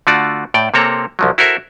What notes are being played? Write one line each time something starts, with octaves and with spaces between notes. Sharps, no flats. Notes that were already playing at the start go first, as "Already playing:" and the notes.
D3 A3 F4 F#4 D5
A2 D5 G5
C3 A#3 C4 A4 C#5 A#5
C2 F3 F#3
E4 F#4 A4 A#4 C5 E5